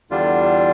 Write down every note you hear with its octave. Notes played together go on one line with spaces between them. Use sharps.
E2 D3 G3 D4 F4